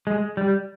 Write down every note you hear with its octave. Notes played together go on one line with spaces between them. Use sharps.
G#3
G3